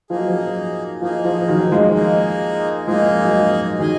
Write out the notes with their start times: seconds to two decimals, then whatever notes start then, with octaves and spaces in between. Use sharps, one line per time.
0.10 F3 A#3 D#4 G#4
0.19 F#3
0.29 F3
1.01 F3 A#3 D#4 G#4
1.24 F3
1.49 D#3 F#3
1.71 F3 G#3
1.94 A#3 D#4 G#4
2.87 F3 G#3 A#3 D#4 G#4
3.24 F#3
3.33 F3 G#3
3.79 D#3 F#3 G#4 D#5 G#5